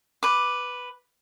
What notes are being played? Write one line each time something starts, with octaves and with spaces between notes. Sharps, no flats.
B4 D6